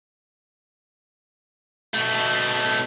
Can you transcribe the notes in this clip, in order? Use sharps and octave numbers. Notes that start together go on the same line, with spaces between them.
B2 A3